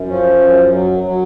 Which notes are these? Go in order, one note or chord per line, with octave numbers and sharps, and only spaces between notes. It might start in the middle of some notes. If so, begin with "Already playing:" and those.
Already playing: F#2
F3 C#4
F#2
F#3
F#3